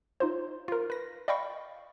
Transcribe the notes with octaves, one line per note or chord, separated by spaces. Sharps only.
D#4 F4 C5
F4 A#4
B4 A#6
D5 D#5 F5 G5 B5 C#6